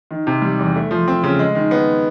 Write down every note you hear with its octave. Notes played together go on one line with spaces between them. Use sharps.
D#3
C3
G3
E2
A3
F3
C4
C#3
G#3
D#3
B3